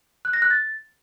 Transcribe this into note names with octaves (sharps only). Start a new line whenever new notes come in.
F#6
A#6
F#6
A6